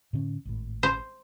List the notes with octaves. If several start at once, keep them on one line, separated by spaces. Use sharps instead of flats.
A2 D3 C#4
G#1 A2
C5